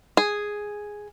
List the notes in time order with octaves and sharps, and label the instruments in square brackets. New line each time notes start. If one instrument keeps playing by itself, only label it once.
[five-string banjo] G#4